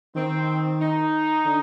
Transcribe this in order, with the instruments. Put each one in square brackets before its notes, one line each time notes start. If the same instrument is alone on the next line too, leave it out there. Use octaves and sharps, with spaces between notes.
[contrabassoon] D#3 [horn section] C4
[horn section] D#4
[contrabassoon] D3